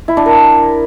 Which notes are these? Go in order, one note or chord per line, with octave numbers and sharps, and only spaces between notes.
E4
D4
A#4